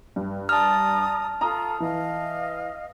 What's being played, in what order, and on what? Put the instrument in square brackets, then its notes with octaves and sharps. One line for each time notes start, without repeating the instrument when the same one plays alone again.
[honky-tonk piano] G2
[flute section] D5 A#5 D#6 [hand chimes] A5 F6
[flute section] F4 A4 [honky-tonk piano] A#5 D#6
[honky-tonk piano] E3 [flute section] D#5 F5